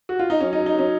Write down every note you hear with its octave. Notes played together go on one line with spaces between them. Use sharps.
F#4
F4
D#4
F#3 C#4
D#4
F#3
D#4
F#3 C#4